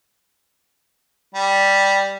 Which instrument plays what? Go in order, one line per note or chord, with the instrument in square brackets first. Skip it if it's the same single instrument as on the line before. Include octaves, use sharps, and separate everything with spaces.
[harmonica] G3